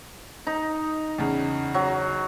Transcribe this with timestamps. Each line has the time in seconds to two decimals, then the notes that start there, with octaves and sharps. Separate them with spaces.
0.47 D#4
1.18 E2 C#3
1.74 F#3